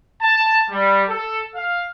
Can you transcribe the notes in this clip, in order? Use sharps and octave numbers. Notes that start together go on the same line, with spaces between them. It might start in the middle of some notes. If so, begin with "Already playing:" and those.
A5
G3
A4
F5